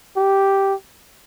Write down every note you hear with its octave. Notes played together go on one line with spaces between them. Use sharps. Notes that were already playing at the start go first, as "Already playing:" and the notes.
G4